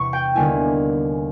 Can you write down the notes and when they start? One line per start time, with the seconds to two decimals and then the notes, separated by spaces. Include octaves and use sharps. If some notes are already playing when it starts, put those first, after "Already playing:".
Already playing: E2 C3 E3 B5 C#6
0.13 G5
0.35 D#2 D3 G3 B3 E4 G#5